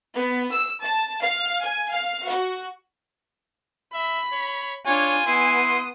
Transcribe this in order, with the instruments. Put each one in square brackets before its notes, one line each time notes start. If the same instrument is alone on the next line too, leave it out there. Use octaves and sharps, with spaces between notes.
[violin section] B3
E6
A5
F5
G#5
F5
F#4
[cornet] E5 [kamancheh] B5
[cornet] C#5
[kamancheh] D4 [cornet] F4 [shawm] C#5 [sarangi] G#5
[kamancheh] B3 D#6 [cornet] E4 [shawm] C6